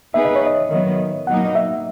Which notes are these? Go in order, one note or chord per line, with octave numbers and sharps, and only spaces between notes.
B3 D#4 G#4 B4 E5
D#5
C#5
D#5
D#3 F#3 B3
B2 F#3 A#3 D#4 F#5
E5